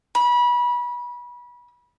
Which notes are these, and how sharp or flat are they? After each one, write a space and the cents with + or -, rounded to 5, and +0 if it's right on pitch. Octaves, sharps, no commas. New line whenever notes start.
B5 -25